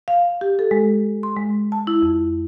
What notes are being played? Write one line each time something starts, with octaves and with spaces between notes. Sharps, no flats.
F5
G4
A4
G#3
C6
G#3
A5
E4
F2